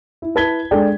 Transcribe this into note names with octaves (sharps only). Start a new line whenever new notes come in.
E4
E4 B4 A5 G#6 B6 G7
G#3 D4 G#4 A4 D5 G5